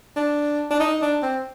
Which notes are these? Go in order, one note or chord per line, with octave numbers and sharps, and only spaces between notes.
D4
D4
D#4
D4
C4